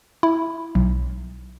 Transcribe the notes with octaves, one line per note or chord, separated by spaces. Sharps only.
E4
B1